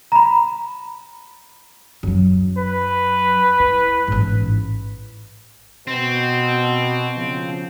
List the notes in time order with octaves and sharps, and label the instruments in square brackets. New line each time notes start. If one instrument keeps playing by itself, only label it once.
[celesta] A#5 B5
[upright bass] F#2 F#3
[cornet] B4
[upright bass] E4
A1 G#2
[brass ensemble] B2 [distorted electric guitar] C4
[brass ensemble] C#3 F3